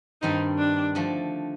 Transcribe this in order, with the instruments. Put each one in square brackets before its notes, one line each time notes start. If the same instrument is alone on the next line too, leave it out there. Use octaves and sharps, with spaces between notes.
[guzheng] G2 D#3 G3 C4 [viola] D#4
[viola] D4
[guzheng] D3 F3 A3